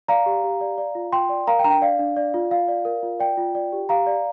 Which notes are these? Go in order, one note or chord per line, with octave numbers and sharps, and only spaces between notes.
D5 F5 A#5
G4
G4
D5
D5
F4
F4 G5 C6
D5
A#4 F5 A#5
G5
D4 A#5
G5
D5 F5
D4
D5
F4
F4 F5
D5
A#4
F4
D5 G5
F4
D5
G4
G4 F5 A#5
D5